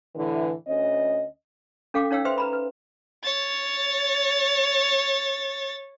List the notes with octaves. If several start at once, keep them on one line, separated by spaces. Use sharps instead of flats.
A2 D3 E3
D2 C#4 D#5
C#4 A4 F5 G5 D6
C#4 D#4 C#5 F5 G5 E6
B4 C5 E5 G5 C6
B4 A#5 B5
B4
C#5 A6